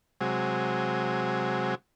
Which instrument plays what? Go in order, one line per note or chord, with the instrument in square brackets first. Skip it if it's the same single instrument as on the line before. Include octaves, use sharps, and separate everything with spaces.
[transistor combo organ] C3 F#3 G#3